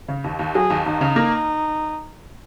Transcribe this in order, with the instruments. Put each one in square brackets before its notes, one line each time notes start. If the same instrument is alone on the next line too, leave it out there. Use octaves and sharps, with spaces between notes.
[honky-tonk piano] C#3
D#2
D#2
[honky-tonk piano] F#3 [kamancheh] G#4
[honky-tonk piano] D#2
[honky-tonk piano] D#2 [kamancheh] D#4
[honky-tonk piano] C#3
A#3